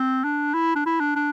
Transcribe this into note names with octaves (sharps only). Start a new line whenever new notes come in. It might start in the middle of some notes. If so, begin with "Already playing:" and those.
Already playing: C4
D4
E4
D4
E4
D4
D4